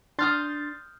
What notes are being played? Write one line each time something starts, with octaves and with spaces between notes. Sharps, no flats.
D4 C6 D#6 F6 G6 A6